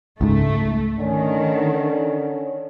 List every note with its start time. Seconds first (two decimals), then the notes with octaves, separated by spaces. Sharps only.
0.21 C#2 G#2 A3
0.98 D3 D#3 C#4